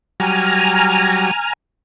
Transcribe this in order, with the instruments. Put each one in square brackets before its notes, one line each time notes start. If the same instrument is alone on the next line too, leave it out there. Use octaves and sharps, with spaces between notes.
[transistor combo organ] F#3 G3 [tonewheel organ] G#5 A#5 F6